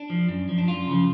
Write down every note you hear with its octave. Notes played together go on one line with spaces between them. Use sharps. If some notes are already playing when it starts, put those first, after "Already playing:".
Already playing: D4
F3
F#2
F3
D4
F#2 F4
C#3 F3